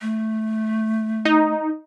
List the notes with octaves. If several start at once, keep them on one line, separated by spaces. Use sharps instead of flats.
A3
D#4